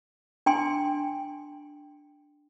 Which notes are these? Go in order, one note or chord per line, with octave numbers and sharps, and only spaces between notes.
D4 G5 G#5 C6